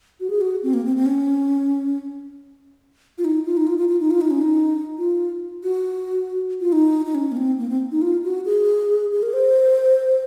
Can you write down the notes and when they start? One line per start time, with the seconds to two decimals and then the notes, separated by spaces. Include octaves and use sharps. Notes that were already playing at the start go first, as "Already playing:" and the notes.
0.20 F#4
0.30 G#4
0.41 F#4
0.63 C4
0.74 A#3
0.85 C4
0.96 C4
1.06 C#4
3.18 F4
3.25 D#4
3.45 F4
3.57 D#4
3.67 F4
3.78 F4
3.89 F4
4.00 D#4
4.11 F4
4.21 D#4
4.30 C#4
4.41 D#4
4.98 F4
5.63 F#4
6.61 F4
6.72 D#4
7.06 D#4
7.15 C#4
7.32 A#3
7.37 C4
7.59 A#3
7.69 C4
7.92 D#4
8.02 F4
8.24 F#4
8.45 G#4
9.12 G#4
9.22 A#4
9.33 C5